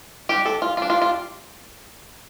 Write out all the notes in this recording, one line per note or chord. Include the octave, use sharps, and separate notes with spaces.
G3 D4 G4
A4
F4
G3 D4 F4
F4
F4